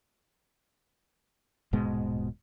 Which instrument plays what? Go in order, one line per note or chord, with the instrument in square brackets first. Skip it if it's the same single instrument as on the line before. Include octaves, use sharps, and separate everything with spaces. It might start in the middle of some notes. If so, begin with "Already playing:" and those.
[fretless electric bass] D#1 G#2 B2 G#3